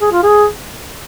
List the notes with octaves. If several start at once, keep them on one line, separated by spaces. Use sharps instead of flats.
G#4
F4
G#4